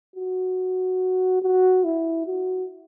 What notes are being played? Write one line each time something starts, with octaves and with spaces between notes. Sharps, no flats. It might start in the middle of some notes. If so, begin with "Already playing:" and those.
F#4
F#4
E4
F#4